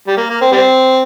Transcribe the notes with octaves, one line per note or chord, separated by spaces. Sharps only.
G3
A#3
A#3
C4
G3 C4